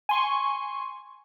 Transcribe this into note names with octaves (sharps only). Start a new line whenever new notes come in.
G#5 C6 C#6